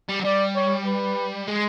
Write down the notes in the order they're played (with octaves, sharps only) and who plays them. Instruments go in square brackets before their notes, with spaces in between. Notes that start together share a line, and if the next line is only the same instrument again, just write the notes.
[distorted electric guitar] G3
F#3
[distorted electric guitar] G3 [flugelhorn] D5
[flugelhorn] C#5
B4
[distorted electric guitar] G#3